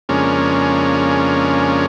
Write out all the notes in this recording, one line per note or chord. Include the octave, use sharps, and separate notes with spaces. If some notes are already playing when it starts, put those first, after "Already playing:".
F2 C#3 G#3 A#3 C#4 D4